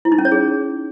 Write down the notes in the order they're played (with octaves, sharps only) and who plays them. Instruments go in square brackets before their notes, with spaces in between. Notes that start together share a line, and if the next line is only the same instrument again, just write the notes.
[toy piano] E4
D#4
C#4
C#5
G#4